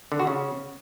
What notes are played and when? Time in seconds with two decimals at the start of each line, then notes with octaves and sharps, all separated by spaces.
0.12 D3
0.19 F#4
0.27 C#3